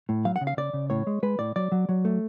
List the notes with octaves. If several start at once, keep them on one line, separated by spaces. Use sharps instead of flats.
A2
F#3 F5
F#5
C#3
F5
C#3 D5
C#3
A2 C#5
G#3
G#3 B4
A2 D5
F#3 D5
F#3
F#3
A3